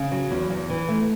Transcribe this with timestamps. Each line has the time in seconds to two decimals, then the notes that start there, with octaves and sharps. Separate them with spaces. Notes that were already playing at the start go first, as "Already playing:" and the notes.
Already playing: C#3
0.12 F#3
0.31 E2
0.50 E2
0.70 E3
0.89 A3